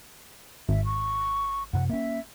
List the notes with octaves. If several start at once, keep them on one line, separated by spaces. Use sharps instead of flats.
G#1 E5
C#6
F#2 C3 F#5
A#3 C#4 E5